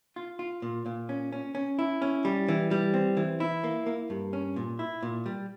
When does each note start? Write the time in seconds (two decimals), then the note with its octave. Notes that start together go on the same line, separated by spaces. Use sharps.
0.16 F4
0.39 F4
0.62 A#2
0.86 A#2
1.09 C#4
1.32 C#4
1.55 C#4
1.79 E4
2.02 C#4
2.25 G3
2.48 E3
2.71 G3
2.94 C4
3.17 E3
3.40 E4
3.64 A#3
3.87 A#3
4.10 G2
4.33 C#4
4.56 A#2
4.79 E4
5.03 A#2
5.26 G3